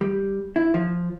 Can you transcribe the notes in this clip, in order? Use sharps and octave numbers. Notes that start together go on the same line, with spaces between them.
G3
E4
F3